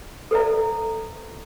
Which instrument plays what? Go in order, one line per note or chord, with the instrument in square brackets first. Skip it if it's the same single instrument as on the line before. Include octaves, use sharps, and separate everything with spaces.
[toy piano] A4 B4 C5 D5 E5 A#5